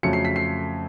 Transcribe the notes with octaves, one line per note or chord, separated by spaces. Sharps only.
F2 C#3 F#3 A3 C#7
C7
B6
C7